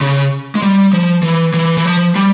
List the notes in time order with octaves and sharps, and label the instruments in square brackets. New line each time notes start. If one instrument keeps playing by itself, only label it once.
[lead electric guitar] C#3
G#3
G3
F3
E3
E3
E3
F3
G3